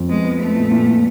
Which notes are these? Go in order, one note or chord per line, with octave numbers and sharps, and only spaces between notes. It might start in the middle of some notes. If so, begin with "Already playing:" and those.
Already playing: F2
G#3 B3
B3
A3 B3
A#2
A#2
A#2